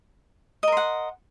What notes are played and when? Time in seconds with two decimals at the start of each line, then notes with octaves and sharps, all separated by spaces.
0.63 D#5
0.68 A#4
0.72 C6
0.77 F#5